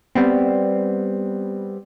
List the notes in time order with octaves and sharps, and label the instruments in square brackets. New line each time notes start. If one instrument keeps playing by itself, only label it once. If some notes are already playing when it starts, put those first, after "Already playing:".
[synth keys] G3 B3 C4